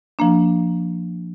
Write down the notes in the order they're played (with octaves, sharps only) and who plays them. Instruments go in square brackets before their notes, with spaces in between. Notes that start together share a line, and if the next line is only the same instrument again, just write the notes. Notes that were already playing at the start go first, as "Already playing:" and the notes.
[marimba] F3 A#3 D4